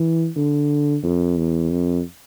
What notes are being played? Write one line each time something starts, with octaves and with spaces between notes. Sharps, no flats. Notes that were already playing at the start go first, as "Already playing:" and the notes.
Already playing: E3
D3
F2
E2
F2